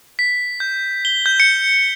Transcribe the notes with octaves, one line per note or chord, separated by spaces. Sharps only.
B6
G6
G7
G6
C#7